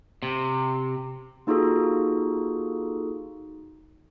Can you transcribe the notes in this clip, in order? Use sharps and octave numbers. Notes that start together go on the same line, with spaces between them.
C3
A#3 D#4 F4 F#4 G#4 A4